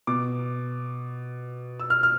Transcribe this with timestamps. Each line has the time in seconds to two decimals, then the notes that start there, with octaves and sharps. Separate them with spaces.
0.07 B2 D6
1.80 E6
1.90 F6
2.03 F6